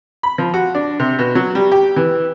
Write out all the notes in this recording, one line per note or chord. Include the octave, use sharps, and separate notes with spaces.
B5
F3
F#4
D4
C3
B2
F#3
G3
G4
E3